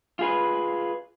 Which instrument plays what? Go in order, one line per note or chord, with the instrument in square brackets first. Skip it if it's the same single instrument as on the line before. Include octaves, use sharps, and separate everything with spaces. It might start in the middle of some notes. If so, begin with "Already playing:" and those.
[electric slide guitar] F4 G#4 B4